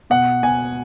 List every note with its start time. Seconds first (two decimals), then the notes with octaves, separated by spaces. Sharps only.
0.10 B2 F#5
0.43 B2 G#5